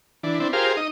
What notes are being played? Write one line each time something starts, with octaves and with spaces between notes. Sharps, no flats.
E3 D4
C4 D4 E4
F4 G4 G#4 A#4 C5 F5
D#4 D#5